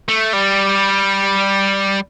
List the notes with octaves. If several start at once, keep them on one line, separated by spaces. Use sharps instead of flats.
A3
G3